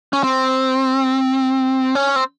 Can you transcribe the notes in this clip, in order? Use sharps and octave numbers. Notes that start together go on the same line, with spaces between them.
C#4
C4
C#4
C4